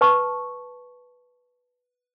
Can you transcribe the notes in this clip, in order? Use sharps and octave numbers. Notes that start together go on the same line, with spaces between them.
B4 A5 C#6